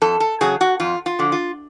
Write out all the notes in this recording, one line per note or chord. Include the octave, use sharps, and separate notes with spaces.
F2 A4
A4
C#3 F#3 G#4
F#4
F2 F4
F4
D3 F3
F4